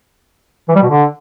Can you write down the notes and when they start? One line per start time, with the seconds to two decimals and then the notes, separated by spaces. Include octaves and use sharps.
0.69 E3
0.75 G3
0.82 B2
0.89 D3